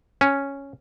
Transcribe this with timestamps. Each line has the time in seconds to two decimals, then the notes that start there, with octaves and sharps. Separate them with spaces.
0.21 C#4